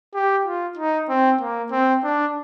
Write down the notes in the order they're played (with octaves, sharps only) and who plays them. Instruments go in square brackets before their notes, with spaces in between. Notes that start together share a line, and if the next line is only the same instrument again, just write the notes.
[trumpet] G4
F4
D#4
C4
A#3
C4
D4